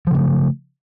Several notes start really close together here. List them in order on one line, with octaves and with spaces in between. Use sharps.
F3 C#3 A3